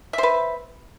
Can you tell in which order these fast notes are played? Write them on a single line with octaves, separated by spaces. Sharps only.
E5 C5 B4